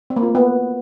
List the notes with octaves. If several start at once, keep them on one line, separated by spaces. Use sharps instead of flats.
C4
A#3
F4
A3
B3